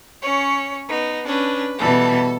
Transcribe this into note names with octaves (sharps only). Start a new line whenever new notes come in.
C#4 C#5
B3 D#4
C#4 D4 B4
B2 E3 G3 A4 A5